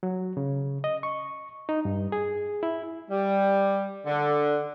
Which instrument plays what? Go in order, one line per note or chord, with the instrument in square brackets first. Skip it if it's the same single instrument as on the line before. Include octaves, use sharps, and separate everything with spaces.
[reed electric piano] F#3
C#3
D#5
C#6
D#4
G2
G#4
E4
[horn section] G3
D3